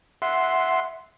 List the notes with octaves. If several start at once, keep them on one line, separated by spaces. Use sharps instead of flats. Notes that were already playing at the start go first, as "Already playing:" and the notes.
E5 F#5 C6